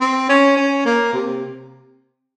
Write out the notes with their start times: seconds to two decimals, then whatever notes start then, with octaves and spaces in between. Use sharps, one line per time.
0.01 C4
0.29 C#4
0.57 C#4
0.85 A#3
1.13 C3